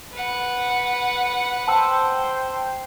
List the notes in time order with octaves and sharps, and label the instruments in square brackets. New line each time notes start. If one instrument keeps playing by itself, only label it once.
[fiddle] B4 F#5
[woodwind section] C5 [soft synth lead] G5 [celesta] A5 E6